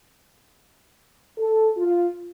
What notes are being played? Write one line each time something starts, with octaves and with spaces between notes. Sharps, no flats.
A4
F4